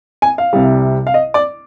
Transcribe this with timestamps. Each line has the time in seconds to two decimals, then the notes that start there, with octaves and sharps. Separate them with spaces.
0.22 G#5
0.38 F5
0.53 C2 C3 G3
1.07 F5
1.14 D#5
1.34 D5